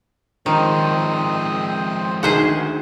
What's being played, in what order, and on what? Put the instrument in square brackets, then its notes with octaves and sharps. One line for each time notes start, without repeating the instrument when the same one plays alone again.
[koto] D#3 [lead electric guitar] F3 G#3 [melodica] C4 C5 D#6
[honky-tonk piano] D2 D#3 [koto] G#4 C5 F#5